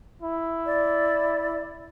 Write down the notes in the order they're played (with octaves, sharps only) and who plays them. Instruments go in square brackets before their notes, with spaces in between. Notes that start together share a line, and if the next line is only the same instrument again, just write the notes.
[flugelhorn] E4
[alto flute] D5